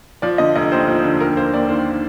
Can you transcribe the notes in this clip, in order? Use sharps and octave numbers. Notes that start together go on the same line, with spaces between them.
F3 D5
D3 D#5
F1 D#5
D#2 C5
F3
D3
D#2 A#4
A#3 C5
D#2 D5
D#3 C5